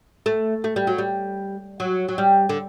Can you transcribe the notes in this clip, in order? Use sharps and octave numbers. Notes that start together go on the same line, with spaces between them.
A3
A3
G3
F#3
G3
F#3
F#3
G3
D3